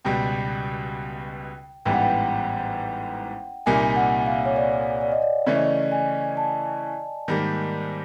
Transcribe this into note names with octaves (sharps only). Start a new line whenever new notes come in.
C#2 B2 G3 G5
A1 G#2 E3 G3 B3 G5
F#5
G5
C2 A#2 G3 A#3 D#4 G#5
F#5
F5
C#5
D5
D5
D#5
D5
C#3 E3 A3 C#4 D5
D#5
D5
G#5
A5
G#2 D#3 G3 A#3